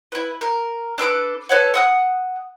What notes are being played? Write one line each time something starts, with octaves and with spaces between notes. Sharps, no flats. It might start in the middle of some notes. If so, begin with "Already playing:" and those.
E4 B4
A#4
D4 A4 B4 D6
A4 B4 C#5 F#5
F#5 D#6 F#6